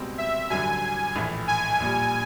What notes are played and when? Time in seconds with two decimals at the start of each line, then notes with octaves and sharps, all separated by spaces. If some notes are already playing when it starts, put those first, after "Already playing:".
Already playing: C#2 B2 G3 C4
0.18 E5
0.50 A1 G2 D3 F#3 G#5
1.15 A#1 A2 E3
1.48 G#5
1.80 A#1 A#2 G3